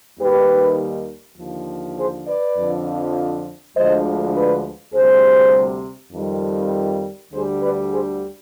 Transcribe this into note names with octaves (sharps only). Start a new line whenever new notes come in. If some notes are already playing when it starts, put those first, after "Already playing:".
D#2 D#3 G3 G4 B4
D#2 D3 F3
G#4 C5
B4 D5
F2 D3 F3
D2 D3 F3 G#3 C5 D#5
B4 D5
D2 C3 G3 G#4 C5
F2 D#3 G3
D2 D3 G3 G#4 C5
B4 D5
G#4 C5